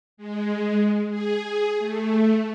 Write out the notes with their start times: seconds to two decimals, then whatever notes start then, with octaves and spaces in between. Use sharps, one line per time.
0.17 G#3
1.09 G#4
1.79 A3